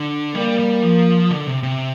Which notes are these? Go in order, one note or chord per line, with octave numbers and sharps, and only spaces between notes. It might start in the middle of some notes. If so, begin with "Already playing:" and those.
Already playing: D3
G3 A#3
G3
F3
D3
C3
C3